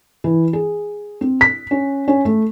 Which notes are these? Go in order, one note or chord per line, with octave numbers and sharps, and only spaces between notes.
E3
G#4
C4
B6
C#4
C#4
A3